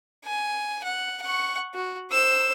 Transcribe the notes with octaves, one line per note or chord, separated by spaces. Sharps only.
G#5
F#5
F#5 C#6
F#4
C5 E6